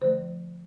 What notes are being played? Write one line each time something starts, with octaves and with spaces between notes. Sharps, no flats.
D3 F3 A3 C5